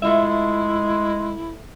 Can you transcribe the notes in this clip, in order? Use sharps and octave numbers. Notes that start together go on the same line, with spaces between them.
G#3 A3 E4 F4 E5